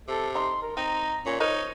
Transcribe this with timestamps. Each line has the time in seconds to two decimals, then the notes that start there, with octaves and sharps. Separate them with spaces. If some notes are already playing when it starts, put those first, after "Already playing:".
0.08 C3 A4
0.35 D#4 C6
0.62 A#4
0.77 C4 D#4 A#5
1.26 A#2 C#4
1.40 D#4 A#4 C5 C#5 D#5